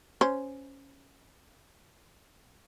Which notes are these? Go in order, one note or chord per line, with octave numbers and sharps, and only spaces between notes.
C#4 C5